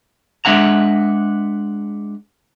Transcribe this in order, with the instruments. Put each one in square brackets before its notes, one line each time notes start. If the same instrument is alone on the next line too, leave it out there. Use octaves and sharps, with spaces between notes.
[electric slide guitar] G#3 D4 E5 F#5 A#5